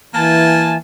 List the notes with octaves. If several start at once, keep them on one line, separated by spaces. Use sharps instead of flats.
E3 A#3 G#5 A5